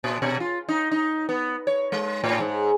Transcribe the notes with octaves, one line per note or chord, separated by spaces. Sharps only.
A#2
B2
F4
D#4
D#4
B3
C#5
G#3
A2
G#2